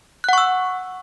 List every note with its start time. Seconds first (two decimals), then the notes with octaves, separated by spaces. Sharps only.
0.24 F#6
0.29 F#5
0.33 C#6
0.38 E6